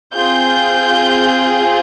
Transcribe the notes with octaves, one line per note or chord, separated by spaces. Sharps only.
C4 F4 G#4 G6